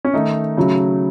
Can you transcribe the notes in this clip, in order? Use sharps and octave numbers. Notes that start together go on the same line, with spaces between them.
C#4
D#3 A3 D#4
C#3 F#3 A3